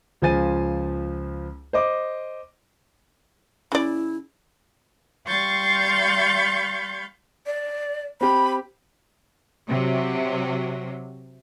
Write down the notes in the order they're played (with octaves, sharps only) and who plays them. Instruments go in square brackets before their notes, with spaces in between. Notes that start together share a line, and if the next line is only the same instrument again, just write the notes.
[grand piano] C#2 F3 C5 G#5 A6 D#7
C5 D#5 D6
[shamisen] C#3 D5 [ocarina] E4
[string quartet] G3 F5 C6 C#6 G6 A6
[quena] D5
[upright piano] C4 G4 [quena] B5
[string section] C3 F#3